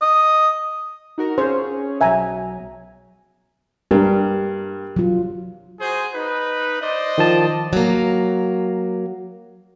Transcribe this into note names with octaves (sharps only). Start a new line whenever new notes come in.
D#5
D#4 F#4 A#4
C#4 G#4 C5 C#5
B1 F#3 E5 G#5 A#5
G2 G4 A#4
F#3 F4
F#4 G#4 C5
D#4 B4
C5 D5 D#5
D#3 F3 A5
F#3 A#3